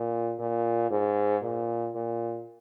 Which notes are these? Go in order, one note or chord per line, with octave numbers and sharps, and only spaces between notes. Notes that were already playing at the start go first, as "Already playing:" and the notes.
Already playing: A#2
A#2
G#2
A#2
A#2